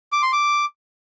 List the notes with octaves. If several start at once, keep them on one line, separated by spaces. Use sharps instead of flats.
D6
C6
D6